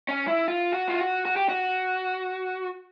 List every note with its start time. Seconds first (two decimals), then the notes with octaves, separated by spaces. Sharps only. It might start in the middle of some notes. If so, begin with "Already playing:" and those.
0.09 C#4
0.28 E4
0.48 F4
0.73 F#4
0.89 F4
0.99 F#4
1.25 F#4
1.36 G4
1.49 F#4